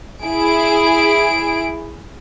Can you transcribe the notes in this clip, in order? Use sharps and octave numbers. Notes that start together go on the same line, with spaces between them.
E4 G#4 D7